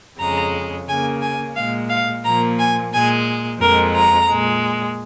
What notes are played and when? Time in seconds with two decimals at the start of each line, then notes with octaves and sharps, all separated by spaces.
0.19 F2 C#3 G#3 A#5
0.87 C#3 A#3 G#5
1.21 G#5
1.55 A#2 G#3 F5
1.89 F5
2.24 A#2 F3 A#3 A#5
2.59 G#5
2.92 A#2 G#3 G#5
3.60 F2 F3 G#3 A#4
3.94 A#5
4.29 A#2 G#3